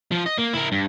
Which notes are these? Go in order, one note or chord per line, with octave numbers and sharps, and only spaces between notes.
F3 F4
D#5
A#3
E4 A#4
G2